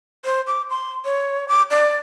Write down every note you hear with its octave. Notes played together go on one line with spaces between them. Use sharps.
C5
D6
C6
C#5
D6
D5